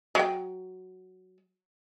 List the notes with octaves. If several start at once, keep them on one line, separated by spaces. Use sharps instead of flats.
F#3 G5